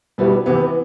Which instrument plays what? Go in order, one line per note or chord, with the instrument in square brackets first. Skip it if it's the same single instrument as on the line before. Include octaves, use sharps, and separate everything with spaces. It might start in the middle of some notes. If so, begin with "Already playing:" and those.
[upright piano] B2 G3 B3 E4
C3 E3 B3